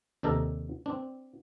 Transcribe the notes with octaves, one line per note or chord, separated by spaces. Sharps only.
D#2 C3 D4 D#4 A4 A#4
C4 D4